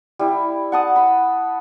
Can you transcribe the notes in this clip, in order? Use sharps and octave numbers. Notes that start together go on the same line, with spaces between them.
G3 E4
F#5 A5 D#6
B5